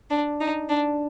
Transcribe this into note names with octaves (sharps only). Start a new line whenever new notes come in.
D4
D#4
D4